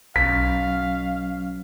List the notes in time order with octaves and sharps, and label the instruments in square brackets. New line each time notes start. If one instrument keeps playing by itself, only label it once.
[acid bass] B1 [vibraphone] F#3 C#4 [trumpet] F5 [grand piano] B6